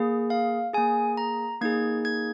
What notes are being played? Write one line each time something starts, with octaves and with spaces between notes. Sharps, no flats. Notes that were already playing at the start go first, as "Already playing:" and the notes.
Already playing: A#3 G#4
F5
A#3 G#4 G#5
A#5
A#3 D#4 G#4 G#6
G#6